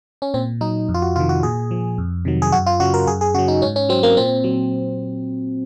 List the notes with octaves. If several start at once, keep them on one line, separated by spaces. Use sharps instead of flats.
C#4
A#2 C4
F#3 D#4
F2
F4
F#4
C3 D#3 F4
F#4
A#2 G#4
F3
F2
C3 D#3 F#3
G#4
F#2 F#4
F4
C#3 F#3 F#4
A#4
F#2 G#4
G#4
C#3 F#3 F#4
D#4
G#2 C#4
C#4
F#3 C4
A#3
A#2 C4
F#3